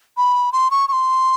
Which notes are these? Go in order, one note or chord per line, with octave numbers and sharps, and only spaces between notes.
B5
C6
C#6
C#6
C6